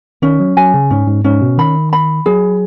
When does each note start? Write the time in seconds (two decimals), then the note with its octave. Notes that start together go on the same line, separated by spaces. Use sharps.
0.22 D#3 C#4
0.40 F#3
0.57 F#3 G#5
0.74 C#3
0.90 G#2 C#4
1.07 G#2
1.24 G#2 C#4
1.41 B2
1.58 D#3 B5
1.93 B5
2.26 F#3 G#4